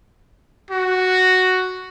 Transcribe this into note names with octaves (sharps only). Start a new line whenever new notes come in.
F#4